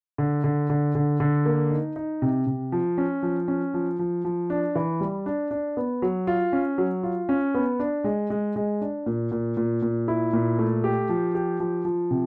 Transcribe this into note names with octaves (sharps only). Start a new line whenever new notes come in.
D3
D3
D3
D3
D3
A#3
D#4
D#4
C3
C3
F3
C#4
F3
C#4
F3
F3
F3
D4
E3
G3
D4
D4
B3
F#3
F4
C#4
F#3
F4
C#4
B3
D4
G#3
G#3
G#3
D4
A#2
A#2
A#2
A#2
E4
A#2
A3
G4
F3
G4
F3
F3
C3